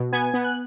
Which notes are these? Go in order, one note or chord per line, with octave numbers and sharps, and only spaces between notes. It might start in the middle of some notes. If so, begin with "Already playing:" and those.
Already playing: B2
B3 G#5 G#6
B3
F#6